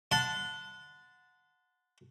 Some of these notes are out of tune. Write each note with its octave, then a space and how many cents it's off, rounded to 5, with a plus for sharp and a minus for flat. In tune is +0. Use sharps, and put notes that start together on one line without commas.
F#5 -20 A5 +0 C6 -35